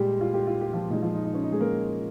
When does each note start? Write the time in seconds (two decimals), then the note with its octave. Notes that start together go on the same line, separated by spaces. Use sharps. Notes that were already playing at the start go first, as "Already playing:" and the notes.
Already playing: A#2 G3 G#3 G4
0.21 F4
0.34 G4
0.47 F4
0.61 G4
0.73 F3 F4
0.90 A#2 F3 G#3 D#4
1.02 F3 F4
1.14 D#4
1.25 D#4
1.34 C#4
1.43 D#4
1.52 G#3 G#4
1.60 A#3 A#4